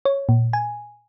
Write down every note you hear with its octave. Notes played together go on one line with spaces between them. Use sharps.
C#5
A#2
G#5